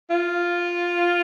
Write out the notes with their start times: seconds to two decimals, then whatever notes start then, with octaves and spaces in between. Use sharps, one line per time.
0.10 F4